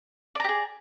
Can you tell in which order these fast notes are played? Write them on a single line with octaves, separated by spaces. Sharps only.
D5 A#5 G4 G#4